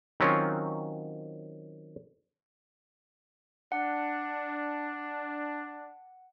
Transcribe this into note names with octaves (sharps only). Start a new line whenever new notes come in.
D#3 F#3 C4 C#4 F4
D4 F#5